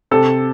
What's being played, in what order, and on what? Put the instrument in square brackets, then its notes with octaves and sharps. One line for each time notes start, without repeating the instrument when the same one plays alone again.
[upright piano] C3 A4